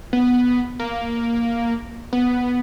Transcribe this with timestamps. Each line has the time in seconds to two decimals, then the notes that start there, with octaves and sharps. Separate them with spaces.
0.13 B3
0.79 A#3
2.13 B3